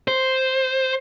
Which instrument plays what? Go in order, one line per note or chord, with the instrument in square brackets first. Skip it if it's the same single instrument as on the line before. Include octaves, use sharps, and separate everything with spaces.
[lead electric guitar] C5